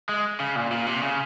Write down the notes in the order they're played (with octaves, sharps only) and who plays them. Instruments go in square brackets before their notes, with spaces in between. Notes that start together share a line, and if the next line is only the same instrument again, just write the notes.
[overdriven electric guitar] G#3
C#3
A#2
A#2
C3
C#3